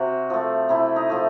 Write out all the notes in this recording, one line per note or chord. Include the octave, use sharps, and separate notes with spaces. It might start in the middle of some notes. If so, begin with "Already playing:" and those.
Already playing: C3 F#4
F3 A3
C3 E4
D#4
F3 A3